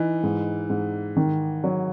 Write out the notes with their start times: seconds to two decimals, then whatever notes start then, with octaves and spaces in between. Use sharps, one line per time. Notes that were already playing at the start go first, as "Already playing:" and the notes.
Already playing: E3 D#4
0.23 G#2
0.70 G#2
1.17 D#3
1.64 F#3